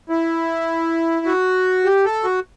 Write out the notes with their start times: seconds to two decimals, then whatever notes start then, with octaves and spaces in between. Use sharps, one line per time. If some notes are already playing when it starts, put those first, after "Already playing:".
0.09 E4
1.26 F#4
1.85 G4
2.05 A4
2.24 F#4